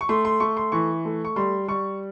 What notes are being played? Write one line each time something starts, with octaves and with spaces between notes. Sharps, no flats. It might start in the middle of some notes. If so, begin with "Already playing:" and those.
C#6
A3 C6
C6
A3 C#6
C6
E3 C#6
A3
C#6
G3 C6
G3 C#6